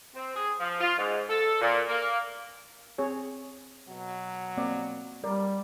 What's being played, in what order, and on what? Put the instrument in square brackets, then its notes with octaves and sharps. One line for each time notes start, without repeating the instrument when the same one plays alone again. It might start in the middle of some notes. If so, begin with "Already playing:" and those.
[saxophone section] C4
G#4
F3
F4
G#2
A4
A#2
A#3
[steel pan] C4 G#4 C#5
[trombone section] B2 F#3
[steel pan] A#3 C4 D5
[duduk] G3 [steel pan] A#4 D5